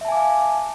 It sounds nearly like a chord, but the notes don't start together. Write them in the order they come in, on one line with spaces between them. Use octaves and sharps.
E5 A5 G#5 D6 F5